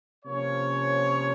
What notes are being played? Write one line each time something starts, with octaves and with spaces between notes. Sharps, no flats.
C3 F3 A#3 C#4 C#5